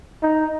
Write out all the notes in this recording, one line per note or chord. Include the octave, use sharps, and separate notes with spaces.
D#4